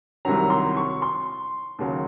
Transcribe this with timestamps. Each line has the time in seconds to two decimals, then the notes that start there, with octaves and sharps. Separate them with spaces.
0.25 C2 C3 D#3 F#3 A#5
0.50 C6
0.77 C#6
1.02 C6
1.79 D#2 C#3 F#3